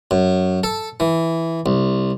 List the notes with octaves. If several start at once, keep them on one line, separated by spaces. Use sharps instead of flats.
F#2
A4
E3
C2